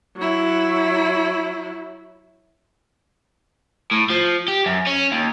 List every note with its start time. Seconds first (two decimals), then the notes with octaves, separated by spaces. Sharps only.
0.17 F#3 E4
3.91 A2
4.10 F3
4.48 G4
4.66 F#2
4.87 C#4
5.12 D#2